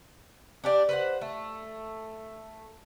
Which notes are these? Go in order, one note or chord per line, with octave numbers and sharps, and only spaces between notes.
D4 G4 D5
B4 C5 F#5
A3